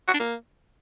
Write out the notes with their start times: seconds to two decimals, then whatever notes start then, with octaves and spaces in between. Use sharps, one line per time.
0.08 F#4
0.14 D4
0.19 A#3